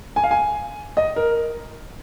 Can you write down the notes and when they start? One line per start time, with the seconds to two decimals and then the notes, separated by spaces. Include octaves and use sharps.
0.16 G#5
0.24 F5
0.31 G#5
0.97 D#5
1.16 A#4